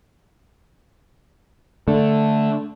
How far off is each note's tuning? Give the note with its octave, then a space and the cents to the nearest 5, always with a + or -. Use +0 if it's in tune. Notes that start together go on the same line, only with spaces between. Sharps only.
D3 +0 A3 -5